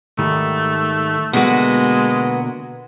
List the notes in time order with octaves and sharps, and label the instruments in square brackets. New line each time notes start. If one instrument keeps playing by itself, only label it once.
[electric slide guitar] G#2 D#3 G3 [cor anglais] A3
[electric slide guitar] B2 D3 A#3 [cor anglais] G#3 [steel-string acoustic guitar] B3 F#4